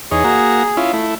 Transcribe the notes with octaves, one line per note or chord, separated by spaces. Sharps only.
E2 D#4 G#4 C#5
A#3 F#4 A#5
C#4 E4 F4
A3 E4